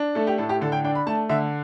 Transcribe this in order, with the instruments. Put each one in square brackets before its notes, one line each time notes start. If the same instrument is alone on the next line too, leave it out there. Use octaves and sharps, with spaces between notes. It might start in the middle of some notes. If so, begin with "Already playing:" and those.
Already playing: [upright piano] D4
A3 A4
G4
A2 A4
G4
D3 A4
G5
D4 G5
B5
A3 A5
D3 E5